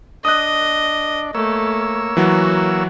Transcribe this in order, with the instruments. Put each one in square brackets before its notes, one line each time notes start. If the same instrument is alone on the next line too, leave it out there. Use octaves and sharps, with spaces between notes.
[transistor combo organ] D4 [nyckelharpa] D#5 [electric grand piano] D#6 F#6
[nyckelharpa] A3 [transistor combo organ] A#3 C#5 E6
[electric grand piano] E3 F#3 [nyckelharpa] F#4